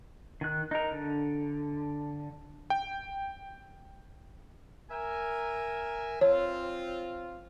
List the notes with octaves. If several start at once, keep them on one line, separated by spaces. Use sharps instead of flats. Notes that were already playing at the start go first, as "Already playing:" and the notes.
D#3 F#6
D#4 A#4
D3
G5
A#4 E5 G#5
C4 F4 C#5